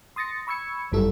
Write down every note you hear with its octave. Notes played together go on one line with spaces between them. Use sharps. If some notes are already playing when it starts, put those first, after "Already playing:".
C6 D#6 A6 A#6 C#7
B5 C#6 E6 G#6 C#7
G1 F#2 G3 E4 A4 E6